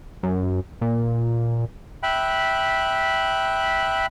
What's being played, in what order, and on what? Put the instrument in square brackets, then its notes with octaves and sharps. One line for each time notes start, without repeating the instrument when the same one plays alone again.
[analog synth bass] F#2
A#2
[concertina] E5 G5 B5 F#6